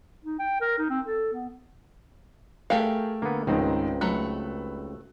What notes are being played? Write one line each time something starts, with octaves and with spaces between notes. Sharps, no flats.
D#4
G5
A#4
D#4
C4
A4
B3
A3 G4 G#4 A#4 F5 G5
D3 A#3 B3
C#2 G#2 D#3 C4 D#4
F#3 A3 B5 F#6